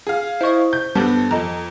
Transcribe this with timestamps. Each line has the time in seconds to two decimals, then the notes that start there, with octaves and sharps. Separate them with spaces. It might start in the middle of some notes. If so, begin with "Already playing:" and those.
0.07 G#4 F5
0.41 E4 C5 D#5 C#6
0.73 G6
0.95 G2 G3 B3 A4 A5
1.31 F2 A4 D#5 A#5